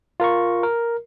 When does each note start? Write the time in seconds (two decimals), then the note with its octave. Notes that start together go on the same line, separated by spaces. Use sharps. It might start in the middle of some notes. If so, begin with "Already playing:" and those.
0.20 F4 A#4 A#5 C#6
0.63 A#4